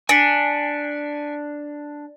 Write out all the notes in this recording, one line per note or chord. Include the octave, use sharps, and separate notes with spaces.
D4 G#5 B6 C#7 D7